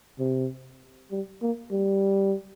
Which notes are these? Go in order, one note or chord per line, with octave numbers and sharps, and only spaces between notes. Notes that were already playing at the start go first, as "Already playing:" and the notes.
C3
G3
A#3
G3